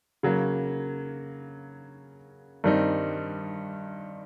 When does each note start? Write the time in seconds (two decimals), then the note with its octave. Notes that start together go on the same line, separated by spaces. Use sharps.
0.23 C#3 F#3 A#3
2.64 G2 D#3 G3 C4 D#4